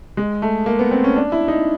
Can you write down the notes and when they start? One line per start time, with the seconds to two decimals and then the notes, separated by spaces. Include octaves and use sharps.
0.17 G#3
0.42 A3
0.66 A#3
0.79 B3
0.91 C4
1.04 C#4
1.16 D4
1.32 E4
1.48 D#4